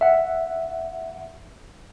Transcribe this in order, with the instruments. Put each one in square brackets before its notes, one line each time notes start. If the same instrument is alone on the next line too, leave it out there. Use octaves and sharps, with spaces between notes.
[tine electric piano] E5 F#5